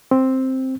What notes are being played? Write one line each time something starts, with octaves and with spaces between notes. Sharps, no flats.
C4